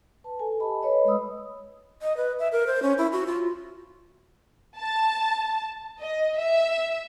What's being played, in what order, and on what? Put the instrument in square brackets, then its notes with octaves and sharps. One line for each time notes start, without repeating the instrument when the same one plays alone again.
[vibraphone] B4 A5
A4 G#5
G4 D#5 A5 B5
B4 C#5 D#5 B5
G#3 B4 D#5 B5 D#6 E6
[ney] D#5
B4
E5
A#4
C5
C#4
E4
F#4
F4
[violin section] A5
D#5
E5